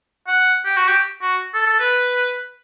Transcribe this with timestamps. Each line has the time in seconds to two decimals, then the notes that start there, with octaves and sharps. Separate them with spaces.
0.27 F#5
0.65 G4
0.77 F#4
0.88 G4
1.22 F#4
1.54 A4
1.67 A4
1.80 B4